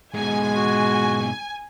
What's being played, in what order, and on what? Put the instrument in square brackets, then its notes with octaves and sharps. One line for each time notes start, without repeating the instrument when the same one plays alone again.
[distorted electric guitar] G#2 B2 [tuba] G#3 [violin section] G#5
[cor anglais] F#4